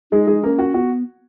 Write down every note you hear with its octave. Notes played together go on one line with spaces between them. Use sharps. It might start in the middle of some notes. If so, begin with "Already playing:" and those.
G#3 D#4 G#4
G#3 G#4
A#3 C#4 A#4
F#4 F#5
B3 F#4